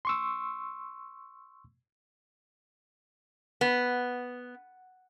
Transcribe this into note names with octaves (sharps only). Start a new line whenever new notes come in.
C6 C#6 E6
B3